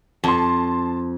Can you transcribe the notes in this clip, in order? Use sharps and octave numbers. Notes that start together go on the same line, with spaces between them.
F2 A5 C6